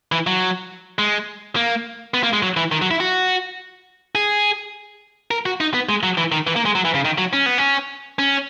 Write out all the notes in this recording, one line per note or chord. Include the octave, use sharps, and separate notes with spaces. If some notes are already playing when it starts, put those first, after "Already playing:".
E3
F#3
G#3
A#3
B3
A#3
G#3
F#3
E3
D#3
F#3
E4
F#4
G#4
A#4
F#4
D#4
B3
G#3
F#3
E3
D#3
E3
A#3
G#3
F#3
E3
C#3
D#3
F#3
C#4
B3
C#4
C#4